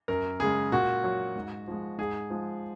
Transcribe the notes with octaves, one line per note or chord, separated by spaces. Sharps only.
F#2 A#4
C#3 G#3 G#4
A#2 F#4
F#3
G#2
F3 G#3
G#2 G#4
F3 G#3